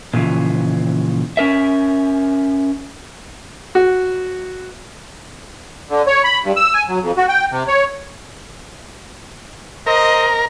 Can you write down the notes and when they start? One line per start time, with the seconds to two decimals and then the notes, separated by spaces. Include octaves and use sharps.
0.14 A#2 C#3 E3 F3
1.37 C#4 A#4 E5
3.75 F#4
5.88 D3
6.07 C#5
6.24 B5
6.44 G2
6.56 E6
6.74 G#5
6.89 F#3
7.02 F2
7.17 F#4
7.29 G5
7.52 C3
7.68 C#5
9.87 A#4 C5 D#5